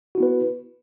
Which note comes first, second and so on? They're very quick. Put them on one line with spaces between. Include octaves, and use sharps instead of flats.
F#4 E4 B3 B4